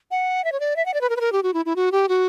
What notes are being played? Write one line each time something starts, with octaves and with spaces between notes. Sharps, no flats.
F#5
E5
C#5
D5
E5
F#5
D5
B4
A#4
B4
A#4
G4
F#4
E4
E4
F#4
G4
F#4